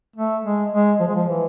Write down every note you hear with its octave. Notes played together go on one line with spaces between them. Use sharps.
A3
G#3
G#3
F3
G#3
F3
E3